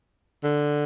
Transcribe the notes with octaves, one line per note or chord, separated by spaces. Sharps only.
D3